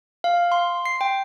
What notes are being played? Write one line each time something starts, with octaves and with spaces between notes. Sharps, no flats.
F5
C6
C7
G5